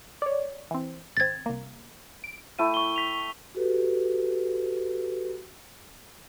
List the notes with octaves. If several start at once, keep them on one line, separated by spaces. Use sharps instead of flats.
C#5 D5
E3 C4
G#1 C4 G#6 A6
C2 A#3
D7
A3 E4 G5 D#7
C#6 G7
B6 F7
F#4 G4 A4 B4